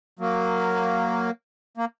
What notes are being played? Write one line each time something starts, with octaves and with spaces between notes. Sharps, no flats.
F#3 A#3
A#3